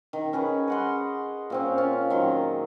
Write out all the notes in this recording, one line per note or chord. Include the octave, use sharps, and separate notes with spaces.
D#3
C#4 G#4 B4
D#5 F#5 C6
A#2 C4 C#4
C#4 F4
D#3 F#3 C6